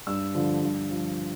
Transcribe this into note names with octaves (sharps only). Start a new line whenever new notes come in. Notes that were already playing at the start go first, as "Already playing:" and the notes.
G2 E6
D3 F3
G2
F3